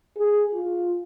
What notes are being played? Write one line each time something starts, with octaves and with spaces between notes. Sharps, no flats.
G#4
F4